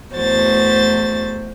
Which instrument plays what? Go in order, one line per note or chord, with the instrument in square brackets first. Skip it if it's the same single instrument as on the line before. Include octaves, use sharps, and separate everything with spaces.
[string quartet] E2 A3 F#4 C5 A6